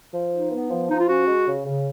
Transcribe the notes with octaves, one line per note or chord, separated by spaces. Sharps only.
F3
D#4
B3
F3
F3 D#4
F4
C#4 F#4
G#3
C#3
C#3